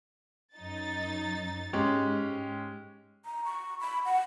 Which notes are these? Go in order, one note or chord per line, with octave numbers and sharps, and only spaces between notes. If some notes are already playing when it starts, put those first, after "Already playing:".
F#2 D#4 A6
G#2 G#3 C#4 G4
A#5
C#6
B5
F#5